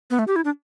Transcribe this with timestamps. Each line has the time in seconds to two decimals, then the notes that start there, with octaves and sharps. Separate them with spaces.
0.10 B3
0.19 A3
0.28 G4
0.36 E4
0.45 D4